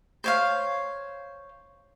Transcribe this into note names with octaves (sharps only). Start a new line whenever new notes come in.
C5 C#5 F5